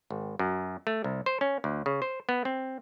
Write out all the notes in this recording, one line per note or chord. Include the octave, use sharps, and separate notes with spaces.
G#1
F#2
A3
C2
C5
C#4
D2
C#3
C5
B3
C4